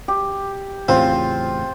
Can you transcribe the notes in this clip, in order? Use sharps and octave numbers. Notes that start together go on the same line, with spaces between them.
G4
E2 A2 C#3 C4 F4 C5